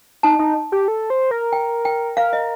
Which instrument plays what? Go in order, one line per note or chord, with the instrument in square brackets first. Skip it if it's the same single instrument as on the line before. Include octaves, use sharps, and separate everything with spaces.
[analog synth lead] D#4 [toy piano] A5
[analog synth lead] D#4
G4
A4
C5
A#4
[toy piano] G5
G5
[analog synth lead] A#4 [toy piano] F5
[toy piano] D#5